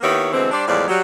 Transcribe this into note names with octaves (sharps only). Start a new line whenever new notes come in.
D#3 A#3 B3 E4 G4 C#5
B2 D3 E3 G#3 C4
G3 D4 C5 D5
E2 A2 F3 G3 G#3 D5
F#3 G3